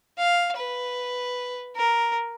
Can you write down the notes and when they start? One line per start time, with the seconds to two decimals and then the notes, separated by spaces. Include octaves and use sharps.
0.17 F5
0.57 B4
1.76 A#4